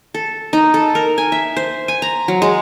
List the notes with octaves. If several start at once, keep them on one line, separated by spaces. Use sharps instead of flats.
A4
D#4
A4
A#4
G#5
E5
C5
G#5
A#5
F#3
G#3